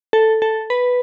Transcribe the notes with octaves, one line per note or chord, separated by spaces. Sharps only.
A4
A4
B4